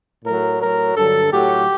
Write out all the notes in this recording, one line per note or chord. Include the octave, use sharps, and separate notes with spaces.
A2 F#3 A#4
A2 F#3 A#4
G2 D3 F#3 A4
A2 F#3 G4